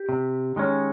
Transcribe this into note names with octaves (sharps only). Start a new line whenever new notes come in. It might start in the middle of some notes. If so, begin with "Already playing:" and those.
Already playing: G4
C3
D#3 G#3 C#4